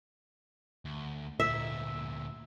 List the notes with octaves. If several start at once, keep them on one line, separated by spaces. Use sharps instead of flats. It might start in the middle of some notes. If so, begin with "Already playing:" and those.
D2
D2 A#2 E5